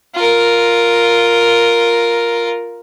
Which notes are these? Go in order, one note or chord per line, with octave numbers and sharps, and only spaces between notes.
F4 A#4